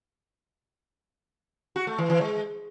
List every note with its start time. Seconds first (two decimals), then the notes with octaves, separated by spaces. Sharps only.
1.76 F#4
1.87 A3
1.98 E3
2.10 E3
2.21 G#3